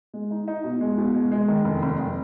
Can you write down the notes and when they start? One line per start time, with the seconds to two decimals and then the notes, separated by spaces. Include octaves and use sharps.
0.14 G#3
0.31 D#4
0.48 D#4
0.64 B2
0.81 G#3
0.98 B2
1.15 G#3
1.32 G#3
1.48 D#3
1.64 F1
1.82 F1
1.98 F1